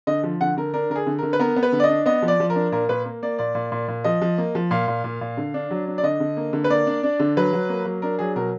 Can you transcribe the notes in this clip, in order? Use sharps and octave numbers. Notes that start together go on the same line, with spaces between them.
D3 D#5
F3
D3 F#5
D3 A#4
D4 A#4
D3 A#4
G#4
D3
D3 A#4
B4
B3 A#4
B3
B4
D3
D5
D#5
D4
B3 D#5
F3
D5
F3
A#4
D4
A#2 A#4
A#2 B4
A#3
A#3 D5
A#2 D5
A#2
A#2
A#2
F3 D#5
F3
A#3
F3
A#2 F5
A#2
A#2
A#2
D3
D4
F#3
D4
D5
D3 D#5
D3
A#3
D3
B4
A#3 D5
D4
D4
D3
F#3 B4
F#3
A#3
F#3
D4 A#4
F#3 G#4
B2 A#4